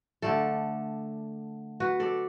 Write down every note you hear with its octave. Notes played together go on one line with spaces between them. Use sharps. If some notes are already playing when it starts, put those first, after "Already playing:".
D3 A3 A4 D5
F#4 B4
A4 D5